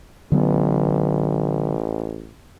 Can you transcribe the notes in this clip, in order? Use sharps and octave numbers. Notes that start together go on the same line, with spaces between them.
A1 D3 F#3 B3